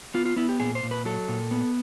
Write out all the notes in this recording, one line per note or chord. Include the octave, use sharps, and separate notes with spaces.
B3 F4
F4
B3 E4
G4
A#2 G#4
C5
A#2
B4
F#3 A4
A#2
B3